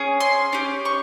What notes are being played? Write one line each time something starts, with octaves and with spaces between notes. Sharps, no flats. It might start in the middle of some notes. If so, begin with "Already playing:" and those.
Already playing: C#4 G#4
C6
C#4 G4
C#6